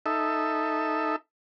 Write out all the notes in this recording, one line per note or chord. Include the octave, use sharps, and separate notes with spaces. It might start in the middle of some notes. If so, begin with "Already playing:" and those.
D#4 A4 E5